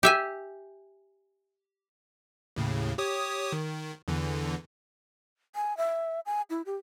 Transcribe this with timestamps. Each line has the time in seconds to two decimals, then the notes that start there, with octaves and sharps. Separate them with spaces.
0.03 G4 E5 G#5
2.56 D#2 A2 C#3
2.98 G4 C#5 D#6
3.52 D#3
4.08 E2 D3 E3
5.55 G#5
5.77 E5
6.26 G#5
6.50 E4
6.66 G4